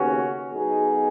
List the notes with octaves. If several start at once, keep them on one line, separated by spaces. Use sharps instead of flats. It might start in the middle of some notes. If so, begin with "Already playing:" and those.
Already playing: D#2 C#3 B3 C#4 F#4
B1 B2 B3 D#4 G#4